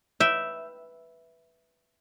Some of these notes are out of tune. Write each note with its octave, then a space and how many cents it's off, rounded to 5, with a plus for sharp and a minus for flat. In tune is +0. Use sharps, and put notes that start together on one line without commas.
B4 +0 E5 +0 G5 -10